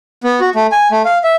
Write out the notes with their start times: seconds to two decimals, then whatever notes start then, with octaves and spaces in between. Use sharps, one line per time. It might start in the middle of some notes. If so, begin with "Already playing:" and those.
0.24 B3
0.40 F#4
0.55 A3
0.72 G#5
0.91 A3
1.05 F5
1.24 E5